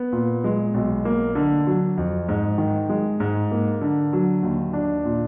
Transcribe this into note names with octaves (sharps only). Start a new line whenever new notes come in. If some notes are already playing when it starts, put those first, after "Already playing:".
Already playing: B3
A#2
G#3
B1
A#3
D3
F#3
F2
G#2
D#3
G#3
G#2
A#3
D3
F#3
D#2
D4
A#2